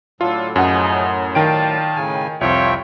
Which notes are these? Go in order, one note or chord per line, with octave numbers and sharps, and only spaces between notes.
A2 D3 F#3 F4 A4
F#2 F3 D#4 G#4 F#5
D#3 D4 F4 G5 A5 D7
A2 C#3 G#5
C2 F2 F4 C5 C#5 E5 G5